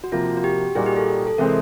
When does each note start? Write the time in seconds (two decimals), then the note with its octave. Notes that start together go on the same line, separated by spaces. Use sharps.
0.04 F#4
0.12 C3 F3 A#3 F4
0.37 F#4
0.44 G4
0.75 A#2 G3 A#3 D#4 F#4 G#4
0.86 G4
0.96 A4
1.27 A4
1.38 C3 E3 G#3 C4 A#4